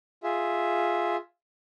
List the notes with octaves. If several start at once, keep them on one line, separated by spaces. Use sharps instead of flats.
F4 G#4 E5